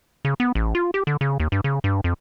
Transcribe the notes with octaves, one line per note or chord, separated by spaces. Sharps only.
C#3
B3
A1
F4
G4
D3
C#3
D#2
G2
C#3
G2
F2